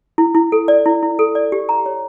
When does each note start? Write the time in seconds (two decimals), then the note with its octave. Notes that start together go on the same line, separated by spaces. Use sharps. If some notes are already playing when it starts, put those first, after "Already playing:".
0.18 E4
0.35 E4
0.52 A4
0.68 D5
0.86 E4
1.03 E4
1.19 A4
1.35 D5
1.52 G4
1.69 A#5
1.86 C#5